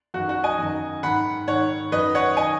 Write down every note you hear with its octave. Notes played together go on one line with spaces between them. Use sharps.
F#2 D#3 F#4
F#4
D#5 G#5
F#2 D#3
G#2 D#3 F#5 B5
G#2 D#3 C#5 F#5
F#2 D#3 B4 D#5
C#5 F#5
D#3 D#5 G#5